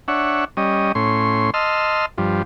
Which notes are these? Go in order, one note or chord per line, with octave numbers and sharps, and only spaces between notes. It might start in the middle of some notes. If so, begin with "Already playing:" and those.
D4 C#5 E5 F#5
G3 C#4 D#5
A2 C#4 C6
D#5 A5 C6 E6 F6
G2 F3